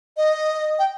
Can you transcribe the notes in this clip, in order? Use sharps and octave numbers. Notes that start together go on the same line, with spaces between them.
D#5
G5